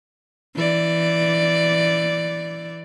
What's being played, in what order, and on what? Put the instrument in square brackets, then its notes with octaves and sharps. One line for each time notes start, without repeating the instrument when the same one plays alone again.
[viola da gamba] E3 D5